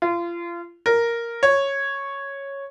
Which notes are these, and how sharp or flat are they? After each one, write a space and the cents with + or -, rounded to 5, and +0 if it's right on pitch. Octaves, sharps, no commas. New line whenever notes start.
F4 -30
A#4 +0
C#5 -5